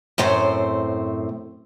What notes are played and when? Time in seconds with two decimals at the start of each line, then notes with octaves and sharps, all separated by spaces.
0.18 F#2 A2 A3 C4 C5